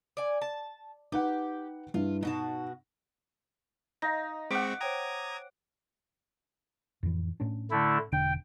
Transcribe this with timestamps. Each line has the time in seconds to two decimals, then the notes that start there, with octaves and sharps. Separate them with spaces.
0.17 D5 G#5
0.42 A5
1.12 D#4 G4 B4 F#5
1.94 G2 E4 F4
2.23 B2 D#4 F#4 A5
4.02 D#4 D#5 F5 A#6
4.51 G#3 C4 F#5 C#6 D6 B6
4.81 C5 C#5 G5 A#5 D#6 G#6
7.03 F2 A2 E3
7.40 A2 C#4 D4
7.71 D3 A3 E4
8.12 E1 D3 D4 G5